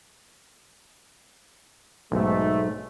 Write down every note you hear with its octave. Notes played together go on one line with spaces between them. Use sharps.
B1 G#2 A3